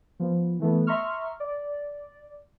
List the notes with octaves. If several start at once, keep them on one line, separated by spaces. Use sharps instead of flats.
F3 B3
E3 A3 B3
E5 A#5 C6 C#6 F6
D5